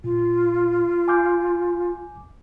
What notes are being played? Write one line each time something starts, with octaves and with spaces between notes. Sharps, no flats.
A#2 F4
G#5 D6 G6